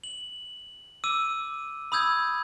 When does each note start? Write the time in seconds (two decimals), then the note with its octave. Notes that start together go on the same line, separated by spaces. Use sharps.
0.04 F#7
1.04 D6 E6 D#7
1.92 B5 D#6 E6 G6 G#6